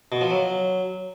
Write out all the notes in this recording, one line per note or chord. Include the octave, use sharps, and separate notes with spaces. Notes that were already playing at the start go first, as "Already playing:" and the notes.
B2
F3
F#3